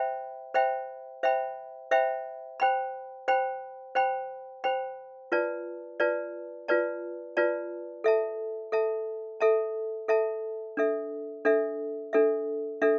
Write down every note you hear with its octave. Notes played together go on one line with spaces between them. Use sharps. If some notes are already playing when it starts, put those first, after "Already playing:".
Already playing: C5 E5 G5 B5
C5 E5 G5 B5
C5 E5 G5 B5
C5 E5 G5 B5
C5 G5 B5
C5 G5 B5
C5 G5 B5
C5 G5 B5
F4 B4 D5 A5
F4 B4 D5 A5
F4 B4 D5 A5
F4 B4 D5 A5
A4 E5 A5
A4 E5 A5
A4 E5 A5
A4 E5 A5
D4 A4 E5
D4 A4 E5
D4 A4 E5
D4 A4 E5